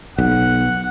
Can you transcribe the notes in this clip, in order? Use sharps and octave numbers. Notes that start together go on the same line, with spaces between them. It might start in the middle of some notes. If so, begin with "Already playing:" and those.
B1 F#5